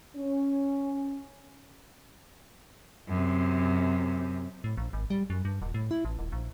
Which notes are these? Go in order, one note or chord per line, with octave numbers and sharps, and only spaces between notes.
C#4
F#2 C3
A2
A#1
G#1
G3
F#2
G2
D#1
A2
E4
A1
D#1
A#1